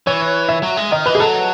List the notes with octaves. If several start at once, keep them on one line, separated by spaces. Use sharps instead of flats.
E3 C#5
E5
F#3
G#3
D#3 D#5
E3 B4
G#4
F#3 A4